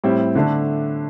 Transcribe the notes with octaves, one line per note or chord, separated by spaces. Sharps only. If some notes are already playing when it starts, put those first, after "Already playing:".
A2 G3 C4 E4
D3 A3 D4